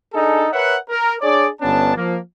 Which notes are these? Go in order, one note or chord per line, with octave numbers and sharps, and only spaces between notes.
D4 D#4 G#4 A4
A#4 B4 C#5 E5 F#5
A#4
D4 G#4 C#5 D5
G1 B3 C#4 D4 A5
F3 A#3